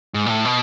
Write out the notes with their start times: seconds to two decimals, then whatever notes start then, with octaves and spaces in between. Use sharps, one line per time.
0.14 G#2
0.26 A#2
0.30 A2
0.45 B2